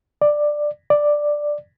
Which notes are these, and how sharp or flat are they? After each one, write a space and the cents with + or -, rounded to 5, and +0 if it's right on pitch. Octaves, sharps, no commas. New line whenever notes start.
D5 +10
D5 +5